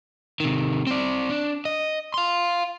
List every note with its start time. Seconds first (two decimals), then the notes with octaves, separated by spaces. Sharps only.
0.40 C3 D#3
0.87 C4 D5
1.30 D4
1.65 D#5
2.14 F5 C6